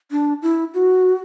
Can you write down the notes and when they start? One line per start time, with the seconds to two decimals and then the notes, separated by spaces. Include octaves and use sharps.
0.11 D4
0.42 E4
0.74 F#4